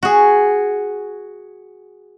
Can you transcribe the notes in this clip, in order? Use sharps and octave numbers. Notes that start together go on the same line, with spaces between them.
F#4 G#4